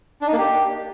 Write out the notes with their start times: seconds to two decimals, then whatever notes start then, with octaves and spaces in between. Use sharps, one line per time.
0.22 D4
0.27 D#4
0.33 A#3
0.38 G4